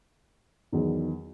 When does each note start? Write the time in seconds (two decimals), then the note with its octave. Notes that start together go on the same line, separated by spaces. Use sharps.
0.72 E2 D#3 F#3